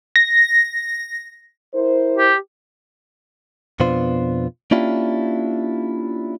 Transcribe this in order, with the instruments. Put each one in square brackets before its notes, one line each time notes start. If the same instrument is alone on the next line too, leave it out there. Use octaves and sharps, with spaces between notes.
[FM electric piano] A#6
[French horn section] E4 A#4 C5
[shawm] G4
[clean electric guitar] F2 B2 B3 D4 F4 C5
A#3 C#4 D4 E4 F4 G4